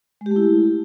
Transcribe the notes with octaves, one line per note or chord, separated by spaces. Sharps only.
G#3
G4
A3
E4